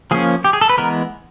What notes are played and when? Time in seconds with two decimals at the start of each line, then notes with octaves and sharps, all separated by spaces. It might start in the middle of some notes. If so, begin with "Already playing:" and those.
0.11 F3 A#3 C#4 G#4
0.44 G4
0.53 G#4
0.61 A4
0.69 B4
0.77 E3 G#3 B3 A#4